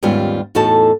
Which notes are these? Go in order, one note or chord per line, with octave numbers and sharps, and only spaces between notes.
D#2 G#2 G3 B3 C#4 F4
E2 A2 D#4 F#4 A4 A5